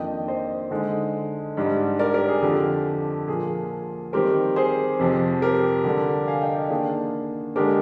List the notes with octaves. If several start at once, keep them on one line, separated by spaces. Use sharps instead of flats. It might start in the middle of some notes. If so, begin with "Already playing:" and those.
Already playing: F2 D#3 A#3 D4 D#5 G5
C5 D#5
D3 G#3 D#4
G#2 G3 D4
A#4 D5
G4 A#4
G#4
F2 D3 F3 G4
A#2 F3 A#3 G#4
D#3 G3 C4 G4 A#4
G#4 C5
F2 C3 F3
G4 A#4
D3 G3 D4
F5 G#5
D#5 G5
D5 F5
D#3 A#3 D4 G#4
D3 G#3 D4 G4 A#4